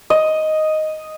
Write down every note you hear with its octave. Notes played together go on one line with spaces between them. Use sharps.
D#5